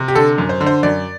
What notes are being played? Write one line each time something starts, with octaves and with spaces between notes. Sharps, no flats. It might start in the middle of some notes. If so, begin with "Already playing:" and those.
Already playing: C3
G4
D3 A4
F#2
C5
D3
C5
F#2 D5